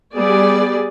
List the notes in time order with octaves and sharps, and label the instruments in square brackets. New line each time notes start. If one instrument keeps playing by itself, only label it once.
[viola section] G3 B3 G#4 D5